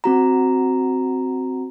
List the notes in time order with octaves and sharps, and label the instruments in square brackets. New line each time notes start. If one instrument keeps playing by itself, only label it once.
[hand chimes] C4 F#4 A#5